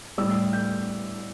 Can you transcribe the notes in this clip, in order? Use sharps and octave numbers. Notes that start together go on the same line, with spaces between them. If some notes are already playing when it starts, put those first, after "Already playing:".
A2 G3 E6
G6